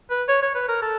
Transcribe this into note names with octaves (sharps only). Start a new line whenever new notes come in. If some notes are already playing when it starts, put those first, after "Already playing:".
B4
C#5
C#5
B4
A#4
A4